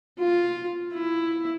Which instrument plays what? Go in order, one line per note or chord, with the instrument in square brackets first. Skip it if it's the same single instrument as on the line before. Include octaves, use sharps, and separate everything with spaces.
[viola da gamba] F4
E4